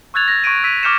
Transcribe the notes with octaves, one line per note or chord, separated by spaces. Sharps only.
C#6 E6 F#6 G#6 A6 F7
A6 A#6
C#6 G#6 D7 D#7
E6 B6 D#7
C#6 D6 F6 G6 C#7 E7